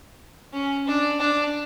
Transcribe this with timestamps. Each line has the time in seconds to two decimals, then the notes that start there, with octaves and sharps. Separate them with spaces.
0.53 C#4
0.87 D4
1.20 D4